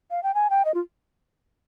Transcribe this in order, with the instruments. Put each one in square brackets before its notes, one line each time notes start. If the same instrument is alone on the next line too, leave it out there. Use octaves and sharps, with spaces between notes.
[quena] F5
G5
G#5
G5
D#5
F4